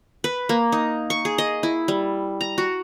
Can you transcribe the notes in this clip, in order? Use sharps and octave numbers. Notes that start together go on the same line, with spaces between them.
B4
A#3
D#4
C#6
G#4
D#5
E4
G3
A#5
F#4